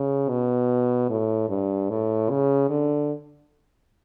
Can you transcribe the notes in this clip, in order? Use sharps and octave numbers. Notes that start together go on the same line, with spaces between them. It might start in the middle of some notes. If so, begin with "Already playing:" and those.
Already playing: C#3
B2
A2
G2
A2
C#3
D3